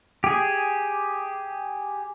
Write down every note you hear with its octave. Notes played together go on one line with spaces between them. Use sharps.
G4 G#4